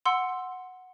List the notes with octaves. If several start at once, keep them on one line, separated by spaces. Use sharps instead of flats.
F#5 C6 E6